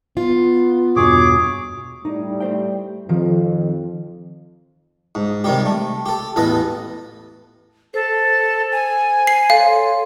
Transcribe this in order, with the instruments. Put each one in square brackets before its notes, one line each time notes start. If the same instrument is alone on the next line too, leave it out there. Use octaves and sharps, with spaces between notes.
[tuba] B3 [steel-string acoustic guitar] F4
[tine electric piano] E2 G2 B2 [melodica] G#4 C#5 D6
[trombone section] A2 G3 [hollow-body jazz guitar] D#4
[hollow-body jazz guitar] A3 C5 G5
[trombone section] F2 [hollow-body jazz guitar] D#3 F3
[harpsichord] G#2
C3 D#3 G3 G4
A3
G4 A4
A1 E2 A4 B4 D#5
[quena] A4 [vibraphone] C5
[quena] G#5
[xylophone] C7
[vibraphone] A4 C#5 C6 [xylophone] F5